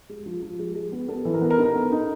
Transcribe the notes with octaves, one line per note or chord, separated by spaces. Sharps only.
G#3
F3
F3
G#3
G#3
B3
B3 A4
E3
A#4
B3
A#4
D#4 A4
B3
D#4